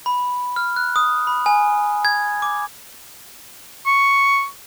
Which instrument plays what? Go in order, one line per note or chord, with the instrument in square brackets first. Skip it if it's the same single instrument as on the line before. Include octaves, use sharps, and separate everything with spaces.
[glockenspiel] B5
F6
F#6
D#6
B5
G#5
G#6
D6
[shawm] C#6